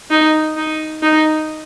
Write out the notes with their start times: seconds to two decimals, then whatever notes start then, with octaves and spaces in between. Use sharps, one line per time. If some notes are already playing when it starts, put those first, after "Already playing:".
0.11 D#4
0.57 D#4
1.02 D#4